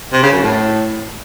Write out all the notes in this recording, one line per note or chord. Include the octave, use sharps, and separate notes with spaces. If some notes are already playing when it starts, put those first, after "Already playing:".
C3
C#3
F#2
A2